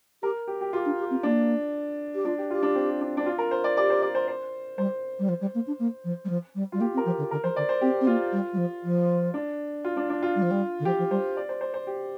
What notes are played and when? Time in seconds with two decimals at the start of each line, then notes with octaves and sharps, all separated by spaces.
0.23 G4 A#4
0.47 G4
0.61 G4
0.73 F4 G4
0.86 D4
0.99 G4
1.11 C4
1.23 A#3 D4
2.15 G4
2.25 D4 F4
2.38 G4
2.50 F4 G4
2.63 D4
2.75 C4
3.01 D4
3.17 D4
3.26 F4
3.38 A#4
3.51 C5
3.64 D5
3.77 G4 D5
3.90 C5
4.02 D5
4.15 C5
4.28 C5
4.78 G3 C5
5.19 G3
5.29 F3
5.41 G3
5.55 A#3
5.67 D4
5.79 A#3
6.04 F3
6.25 G3
6.29 F3
6.55 G3
6.72 G3 F4
6.80 A#3 G4
6.94 C4
6.97 A#4
7.05 F3 G4
7.18 D3
7.31 D3 A#4
7.44 F3 C5
7.56 D3 D5
7.69 C5
7.81 C4 G4
8.01 C4
8.07 A#3 F4
8.32 G3
8.53 G3
8.57 F3
8.84 F3
9.34 D4
9.85 F4
9.97 D4
10.10 D4
10.23 F4
10.36 G3
10.42 F3
10.51 G3
10.80 D3
10.85 F3 G4
10.98 F3
11.11 G3 C5
11.37 D5
11.49 C5
11.61 C5
11.74 C5
11.87 G4